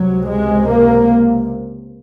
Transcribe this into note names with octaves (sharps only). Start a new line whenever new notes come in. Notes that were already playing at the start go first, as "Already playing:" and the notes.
Already playing: C#2 C3 F#3
G#3
A#3